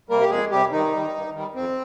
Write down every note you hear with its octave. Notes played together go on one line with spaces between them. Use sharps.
C3 G3 A#3 A#4
G4
F2 G#3 G#4
C3 G3 G4
G2 D#3 D#4
D#3 G3
G2
D#3 G3
F2 C4